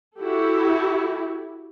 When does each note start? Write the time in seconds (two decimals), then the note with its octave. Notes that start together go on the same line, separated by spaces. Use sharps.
0.20 E4 F#4 G4 A4